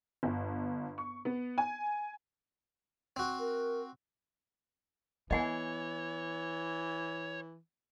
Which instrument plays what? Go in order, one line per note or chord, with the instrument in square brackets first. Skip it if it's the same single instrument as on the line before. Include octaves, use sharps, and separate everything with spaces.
[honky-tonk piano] G1
C#6
B3
G#5
[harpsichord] C4 F#4
[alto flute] A#4
[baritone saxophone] E3 [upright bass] B3 [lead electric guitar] C#5 [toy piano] D#5 F#5 G#5